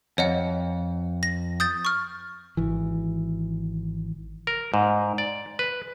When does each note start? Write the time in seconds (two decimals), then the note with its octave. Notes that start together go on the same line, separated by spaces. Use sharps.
0.18 F2 C#5 D#5 F#5
1.23 A#6
1.60 D#6 G6 A6
1.85 C#6 F6
2.57 G#1 E3
4.47 A#4
4.74 G#2
5.18 D5
5.59 B4